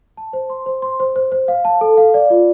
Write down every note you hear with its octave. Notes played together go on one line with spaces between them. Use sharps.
A5
C5
C6
C5
C6
C5
C5
C5
F5
A5
A4
F5
D5
F4